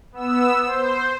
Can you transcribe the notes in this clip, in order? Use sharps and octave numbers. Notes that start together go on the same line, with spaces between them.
B3 E6
C5